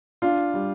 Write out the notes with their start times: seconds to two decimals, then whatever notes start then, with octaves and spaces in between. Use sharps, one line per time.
0.22 D4 F4
0.54 G3